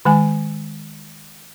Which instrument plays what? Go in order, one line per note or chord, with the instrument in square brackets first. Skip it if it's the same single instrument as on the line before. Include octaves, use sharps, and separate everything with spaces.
[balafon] D#3 G#3 G#5